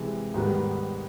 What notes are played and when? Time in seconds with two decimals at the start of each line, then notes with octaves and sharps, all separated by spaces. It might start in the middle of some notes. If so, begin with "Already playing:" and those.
Already playing: C3 E3 G#3
0.34 G#2 D#3 G3 B3 D#4